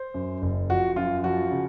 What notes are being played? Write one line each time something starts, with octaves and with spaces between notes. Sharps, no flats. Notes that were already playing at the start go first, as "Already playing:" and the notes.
Already playing: C5
F#2
F#1
F3 F#4
F#2 F4
F3 F#4
C#3